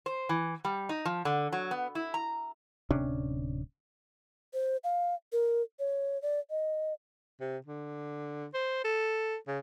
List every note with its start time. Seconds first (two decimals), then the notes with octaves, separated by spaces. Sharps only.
0.06 C5
0.29 E3
0.65 G3
0.89 D#4
1.05 F3
1.25 D3
1.52 F#3
1.71 B3
1.95 E4
2.14 A#5
2.91 D1 C3 C#4 D4
4.54 C5
4.84 F5
5.32 A#4
5.79 C#5
6.22 D5
6.50 D#5
7.41 C3
7.66 D3
8.54 C5
8.84 A4
9.47 C#3